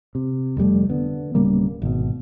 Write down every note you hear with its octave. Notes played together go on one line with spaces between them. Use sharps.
C3
F1 F2 G3 A3
D3 B3
D1 C#3 G3 A#3
G#1 B2